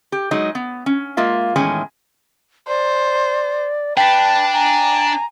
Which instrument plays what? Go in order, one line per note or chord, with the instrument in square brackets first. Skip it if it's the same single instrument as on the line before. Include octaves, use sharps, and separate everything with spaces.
[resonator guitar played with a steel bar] G4
F#3 G#3 D#4 D#5
B3
C#4
G#3 A#3 F4 E5
E2 A2 D#3 G#3 C#4 G#5
[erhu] C5 [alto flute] D5
[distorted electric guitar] D4 [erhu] B4 [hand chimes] G5 B6 [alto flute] A5
[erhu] G#5 [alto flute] A#5